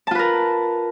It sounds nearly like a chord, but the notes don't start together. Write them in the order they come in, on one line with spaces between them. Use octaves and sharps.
A5 F4 B4 A#4